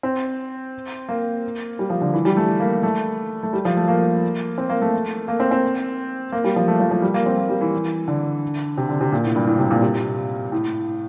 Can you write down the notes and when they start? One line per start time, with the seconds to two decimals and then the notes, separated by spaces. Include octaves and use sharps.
0.03 C4
1.09 A#3
1.79 G3
1.90 F3
2.01 D3
2.14 E3
2.25 G3
2.37 A3
2.60 A#3
2.83 A3
3.43 A3
3.53 G3
3.65 F3
3.77 A3
3.88 A#3
4.58 C4
4.69 A#3
4.82 A3
5.28 A#3
5.40 C4
5.51 C4
6.32 A#3
6.44 G3
6.56 F3
6.68 A3
6.80 F3
6.91 F3
7.02 G3
7.14 A#3
7.26 C4
7.38 A#3
7.49 G3
7.61 E3
8.08 D3
8.77 C3
8.89 D3
9.01 C3
9.12 A#2
9.24 A2
9.36 G2
9.47 A2
9.59 C3
9.71 A#2
9.82 C3
10.52 A2